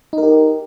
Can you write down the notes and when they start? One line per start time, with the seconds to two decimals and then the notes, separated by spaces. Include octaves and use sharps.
0.13 D#4
0.18 A#4
0.23 G4